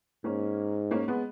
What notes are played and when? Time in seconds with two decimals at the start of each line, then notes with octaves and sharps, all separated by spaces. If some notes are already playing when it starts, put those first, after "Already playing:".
0.24 G#2 A#3 C#4
0.91 A#3 C#4
1.08 G#3 B3